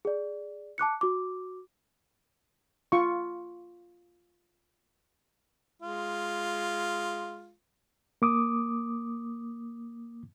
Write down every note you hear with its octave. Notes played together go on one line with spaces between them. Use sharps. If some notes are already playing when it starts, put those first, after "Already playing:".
G#4 D5
A5 D6 F#6 C#7
F#4 D6
F4 C#6
G#3 F4
A#3 D6 D#6